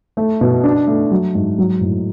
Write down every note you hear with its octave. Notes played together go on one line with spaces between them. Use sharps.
A3
B2
D4
A3
F#3
G#2
F#3
A2